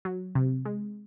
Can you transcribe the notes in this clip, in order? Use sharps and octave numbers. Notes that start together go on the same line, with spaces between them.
F#3
C3
G#3